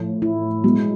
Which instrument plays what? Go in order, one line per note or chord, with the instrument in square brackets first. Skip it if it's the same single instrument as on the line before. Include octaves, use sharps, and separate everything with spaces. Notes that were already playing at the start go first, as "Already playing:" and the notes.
Already playing: [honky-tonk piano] A2 F3
[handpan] E4
[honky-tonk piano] B2 F#3 B3 [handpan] G#3